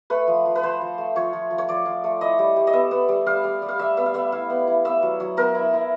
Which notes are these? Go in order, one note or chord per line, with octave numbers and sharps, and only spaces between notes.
A3 B4
F3
F3
B4
F3 C5
F3
A3
F3 C#5
F3
F3
C#5
F3 D5
F3
A3
E4 D#5
G3
G3
D#5
B3 E5
B3
G3
G3 F5
G3
G3
F5
G3 E5
B3 E5
F5
B3 E5
E4 F5
B3
E4
B3 E5
F#3
F#3
B3 A#4
E4
E4